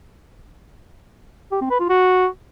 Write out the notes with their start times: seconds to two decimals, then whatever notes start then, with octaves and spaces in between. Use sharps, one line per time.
1.52 G4
1.61 C4
1.71 B4
1.80 F4
1.89 F#4